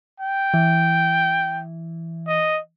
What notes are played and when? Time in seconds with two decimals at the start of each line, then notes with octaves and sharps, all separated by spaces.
0.20 G5
0.54 E3
2.28 D#5